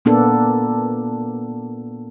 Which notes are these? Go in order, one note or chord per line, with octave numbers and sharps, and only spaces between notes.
A#2 A#3 B3 D4 A4